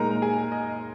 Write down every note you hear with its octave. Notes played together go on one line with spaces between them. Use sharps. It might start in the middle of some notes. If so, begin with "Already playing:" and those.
Already playing: A#2 G#3 D#4 A#4 A#5
G#4 G#5
D#5